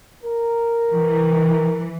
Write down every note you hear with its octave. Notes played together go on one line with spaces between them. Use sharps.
A#4
E3